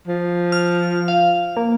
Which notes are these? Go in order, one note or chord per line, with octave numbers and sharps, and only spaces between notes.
F3
F6
F5
A#3